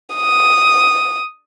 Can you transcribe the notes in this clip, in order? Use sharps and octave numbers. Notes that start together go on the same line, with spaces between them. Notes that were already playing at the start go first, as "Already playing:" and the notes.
D#6